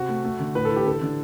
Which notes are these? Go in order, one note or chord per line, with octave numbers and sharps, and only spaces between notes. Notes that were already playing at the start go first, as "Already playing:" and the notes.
Already playing: C3 F#4
A3
A3
D3
A2 B4
A4
E3
G4
D3 A4
D3